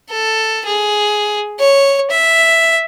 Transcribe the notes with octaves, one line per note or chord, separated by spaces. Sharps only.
A4
G#4
C#5
E5